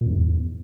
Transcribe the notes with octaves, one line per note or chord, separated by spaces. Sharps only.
A#2
F#2
G#2
E2